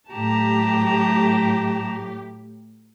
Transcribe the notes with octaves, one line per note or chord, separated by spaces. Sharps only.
A2 F#3 G4 A5 A#5